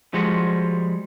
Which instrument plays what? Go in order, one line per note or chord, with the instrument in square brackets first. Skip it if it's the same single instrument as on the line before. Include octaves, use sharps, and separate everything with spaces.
[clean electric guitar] F3 G3 G#3 F#4